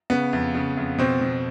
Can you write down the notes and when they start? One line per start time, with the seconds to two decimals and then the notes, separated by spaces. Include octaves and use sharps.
0.10 C#3 B3
0.33 F2
0.55 C#3
0.77 F2
0.98 B2 C4
1.21 B2